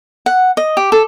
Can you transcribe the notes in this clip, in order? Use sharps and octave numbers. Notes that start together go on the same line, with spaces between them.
F#5
D#5
G4
A4